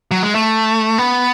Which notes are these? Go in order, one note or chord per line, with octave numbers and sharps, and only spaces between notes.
F#3
G#3
A3
B3